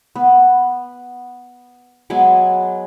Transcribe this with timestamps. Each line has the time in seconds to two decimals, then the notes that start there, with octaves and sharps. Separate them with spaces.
0.16 B3
2.10 F#3 G#3 B3 G#5